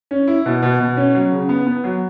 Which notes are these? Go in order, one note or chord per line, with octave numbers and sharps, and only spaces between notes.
C#4
E4
B2
B2
B2
C#4
F#3
C#3
B3
B3
F#3